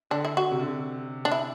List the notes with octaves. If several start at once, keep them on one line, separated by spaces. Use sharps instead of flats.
D3 D4
E4
F#4
C3
D3
C3
D4
E4